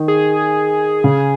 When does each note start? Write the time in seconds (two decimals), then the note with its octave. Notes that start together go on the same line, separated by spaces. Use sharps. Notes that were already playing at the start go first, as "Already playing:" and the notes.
Already playing: D#3
0.08 G#4
1.04 C#3